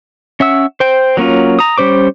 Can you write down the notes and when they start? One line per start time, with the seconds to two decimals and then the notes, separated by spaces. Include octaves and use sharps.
0.40 C#4 E5 F#5 E6
0.80 C5 G5
1.17 F#3 A#3 C#4 F4
1.59 A#5 D#6
1.78 G3 C#4 C5 D6